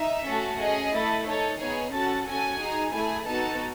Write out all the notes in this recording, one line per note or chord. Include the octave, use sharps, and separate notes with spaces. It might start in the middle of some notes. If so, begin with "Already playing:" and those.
Already playing: D#4 E5
A3 C#4 F#4 A4
C#4 G#4 D#5
A3 E4 A4
D#4 A4 C#5
B3 D#4 G#4 C#5
C#4 F#4 A4 A5
C#4 F#4 A4 G#5
D#4 G#4
A3 E4 G#4 G#5
B3 D#4 F#4 A4 A5